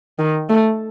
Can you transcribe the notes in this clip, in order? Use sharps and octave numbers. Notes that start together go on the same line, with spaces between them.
D#3
A3